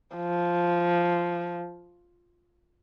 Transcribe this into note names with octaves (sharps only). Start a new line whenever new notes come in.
F3